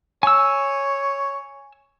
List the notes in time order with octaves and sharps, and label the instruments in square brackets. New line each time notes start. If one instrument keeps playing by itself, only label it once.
[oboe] C#5 [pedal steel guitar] G#5 E6